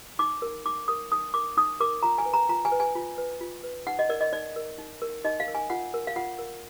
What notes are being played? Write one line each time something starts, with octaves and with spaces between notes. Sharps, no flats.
D#4 D6
A#4
D#4 D6
A#4 D#6
D#4 D#6
A#4 D6
D#4 D#6
A#4 D6
F4 A#5
G#5
B4
A#5
F4 A#5
G#5
B4
G#5
F4
B4
F4
B4
D#4 F#5
D#5
A#4 D5
D#5
D#4 D5
A#4
D#4
A#4
D#4 D#5
F5
A#4
G#5
F4 F#5
A#4
F5
F4 F#5
A#4